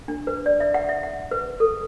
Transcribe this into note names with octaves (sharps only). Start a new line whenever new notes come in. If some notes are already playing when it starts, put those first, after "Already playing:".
D4
B4
D5
E5
F#5
E5
F#5
B4
A4